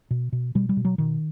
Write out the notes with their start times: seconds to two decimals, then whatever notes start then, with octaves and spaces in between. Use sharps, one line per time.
0.11 B2
0.32 B2
0.55 B2 G3
0.69 G3
0.77 B2
0.85 F#3
0.98 B2 D#3